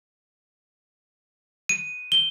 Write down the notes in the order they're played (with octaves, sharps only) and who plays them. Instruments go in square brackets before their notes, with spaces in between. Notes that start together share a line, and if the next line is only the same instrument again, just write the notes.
[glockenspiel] D#7
G7